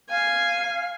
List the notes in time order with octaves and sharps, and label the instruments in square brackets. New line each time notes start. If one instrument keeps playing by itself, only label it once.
[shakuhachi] F5 [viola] G#5